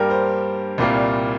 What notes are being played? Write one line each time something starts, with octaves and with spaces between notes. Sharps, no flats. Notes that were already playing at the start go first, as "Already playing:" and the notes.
Already playing: G2 G3 A#3 G4 A#4
C5
C2 A#2 G3 A#3